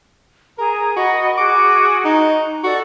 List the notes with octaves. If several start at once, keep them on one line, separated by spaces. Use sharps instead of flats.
G#4 A#4 A#5
F#4 D#5 F#5 B5
F#4 G#4 D6
D#4
F#4 A4 D5